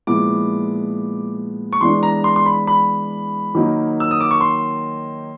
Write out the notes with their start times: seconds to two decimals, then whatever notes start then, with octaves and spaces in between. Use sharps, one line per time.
0.07 A#2 F3 G#3 B3 E4 D6
1.73 C#6
1.81 E3 G#3 B3 D4 C6
2.03 A#5
2.24 C6
2.36 C6
2.46 B5
2.67 B5
3.55 D#3 F#3 A#3 D#4
4.00 E6
4.11 D#6
4.21 D6
4.31 C#6
4.41 C6